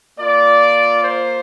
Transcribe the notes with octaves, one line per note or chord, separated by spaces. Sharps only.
A#3 F4 D5
C5